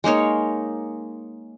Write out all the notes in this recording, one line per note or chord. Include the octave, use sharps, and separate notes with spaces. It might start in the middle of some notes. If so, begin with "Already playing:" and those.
G#3 A#3 D#4 C#5